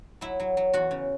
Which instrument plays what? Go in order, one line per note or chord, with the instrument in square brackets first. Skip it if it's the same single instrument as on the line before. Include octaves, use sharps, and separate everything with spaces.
[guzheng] F#3 E4 E5
F#3
F#3
E2 F#4 F#5
C#3